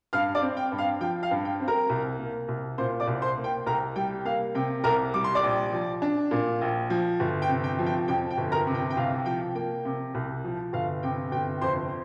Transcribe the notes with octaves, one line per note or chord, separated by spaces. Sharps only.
G2 F5 F6
D5 D6
C4
G5
G2
F5
F3 G5
F5
G2
G5
C4
A#4 A#5
C2
A#3
C2
A#2 C5 C6
D5 D6
C2
C5 C6
A#3
G5
C2 A#4 A#5
G3 G5
A#3 F5
C3 G5
C2 A#4 A#5
G3 D6
C6
D5 D6
A#1
F3
D4
A#2
A#1
F3
G1
G5
C3
G5
F3
G5
F2 G5
G5
G1
A#4 A#5
C3
G5
G5
C2 F5
F3 G5
A#3 G5
C3
C2
F3
G1 F5
C3 G5
G1 G5
F2 C5 C6